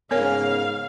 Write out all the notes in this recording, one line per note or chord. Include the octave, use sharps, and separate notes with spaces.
G#2 C#3 B3 A#4 C#5 F5